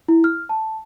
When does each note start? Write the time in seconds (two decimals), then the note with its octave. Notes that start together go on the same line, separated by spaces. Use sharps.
0.08 E4
0.24 F6
0.49 A5